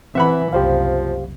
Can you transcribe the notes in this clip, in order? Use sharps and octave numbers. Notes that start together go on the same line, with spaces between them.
E3 C4 E5 F#5 B5
F#1 C2 F3 G4 C5 F5